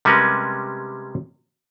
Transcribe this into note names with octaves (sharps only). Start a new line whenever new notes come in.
C3 G3 G#3 C#4 A#4 B4